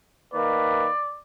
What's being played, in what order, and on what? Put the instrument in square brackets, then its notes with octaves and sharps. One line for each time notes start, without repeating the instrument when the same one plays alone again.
[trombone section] D#3 A#3 B4 [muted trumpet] D5